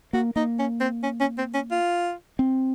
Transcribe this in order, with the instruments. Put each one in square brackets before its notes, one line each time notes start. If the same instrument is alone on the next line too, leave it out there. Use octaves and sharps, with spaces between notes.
[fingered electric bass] A#3 [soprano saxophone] F#4
[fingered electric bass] A#3 [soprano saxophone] D#4
[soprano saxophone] C#4
C4
C#4
C#4
C4
C#4
F4
[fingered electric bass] C4